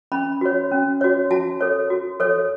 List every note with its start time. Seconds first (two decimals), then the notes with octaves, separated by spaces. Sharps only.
0.12 C#4 B5
0.41 F#4 C#5
0.71 C#4
1.01 F#4 C#5
1.31 F#4 A5
1.61 A4 C#5
1.90 F#4
2.20 A4 C#5